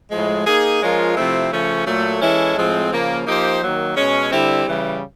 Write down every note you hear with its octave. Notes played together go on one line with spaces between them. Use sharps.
A2 F3 G#3
A#3 D#4 G#4
F3 G#3 C#4 F4 A#4
C3 F3 A3 C4 E4
C#3 F3 A3 C#4
A#2 F#3 A3
E3 G#3 C#4 E4 A4
A2 F3 G#3 C4
C#3 F3 A#3
F3 A#3 D#4 G4 C5
D#3 F#3 A#3
B2 G#3 C#4
D3 G3 C4 E4
C#3 E3 G3